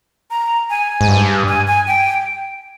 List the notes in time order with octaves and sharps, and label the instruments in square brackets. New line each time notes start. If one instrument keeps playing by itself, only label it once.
[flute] A#5
G#5
[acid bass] G#2
G2
[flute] G#5
G#5
G5